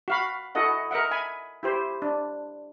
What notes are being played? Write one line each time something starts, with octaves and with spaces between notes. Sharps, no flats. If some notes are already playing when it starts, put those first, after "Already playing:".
F#4 F5 B5
E4 F#4 A4 D#5 F#5
A#4 D#5 E5 F#5
E5 G#5 B5
E4 G4 C5
D4